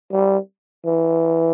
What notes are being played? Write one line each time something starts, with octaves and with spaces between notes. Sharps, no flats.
G3
E3